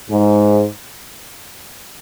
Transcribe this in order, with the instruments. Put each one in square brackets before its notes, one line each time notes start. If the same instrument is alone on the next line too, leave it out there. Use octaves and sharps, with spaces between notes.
[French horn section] G#2